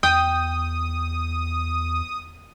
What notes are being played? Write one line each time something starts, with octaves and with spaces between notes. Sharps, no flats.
E2 G5 D#6